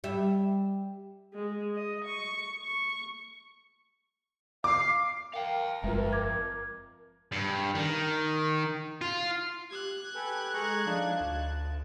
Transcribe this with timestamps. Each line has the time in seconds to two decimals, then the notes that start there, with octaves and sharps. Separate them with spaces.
0.04 G3 E5
1.33 G#3
1.75 D#5
2.05 C#6
2.60 C#6
4.64 F5 D6
5.34 A#4 F5 G5
5.84 G1 F2 G#3 F4 B4 E5
6.13 D6 G#6
7.32 G2
7.75 D#3
9.01 F4
9.71 G4 F#6 G#6
10.15 G4 A4 B4 G#5
10.54 G#3 G#4 A4 A#5 C#6
10.86 F3 D4 D#4 F5 A5
11.21 D2 A5